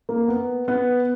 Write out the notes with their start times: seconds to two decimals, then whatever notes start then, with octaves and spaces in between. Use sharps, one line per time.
0.09 A#3
0.28 B3
0.68 B3